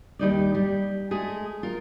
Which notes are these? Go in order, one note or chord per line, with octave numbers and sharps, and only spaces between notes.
D#2 G3 D#4 D5
G3
G#3 A3 G#4
F4 A#4